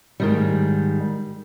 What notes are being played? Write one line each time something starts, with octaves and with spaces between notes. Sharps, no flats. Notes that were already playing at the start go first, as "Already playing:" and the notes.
G#2 D#3 G3